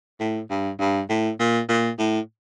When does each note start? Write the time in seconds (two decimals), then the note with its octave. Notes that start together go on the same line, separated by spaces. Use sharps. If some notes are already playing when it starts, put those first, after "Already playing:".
0.20 A2
0.50 G2
0.80 G2
1.10 A2
1.39 A#2
1.69 A#2
1.99 A2